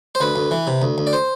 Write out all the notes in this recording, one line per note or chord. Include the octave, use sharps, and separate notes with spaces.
C5
D2 B4
D2
E3
C3
D2
D2
D5
C5